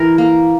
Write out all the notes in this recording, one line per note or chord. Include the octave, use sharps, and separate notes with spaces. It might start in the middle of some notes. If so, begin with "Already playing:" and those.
Already playing: E3 A#4
A#3